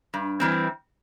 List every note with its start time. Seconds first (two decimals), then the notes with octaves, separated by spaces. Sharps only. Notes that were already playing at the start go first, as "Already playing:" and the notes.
0.14 G2
0.40 E3 G3 C4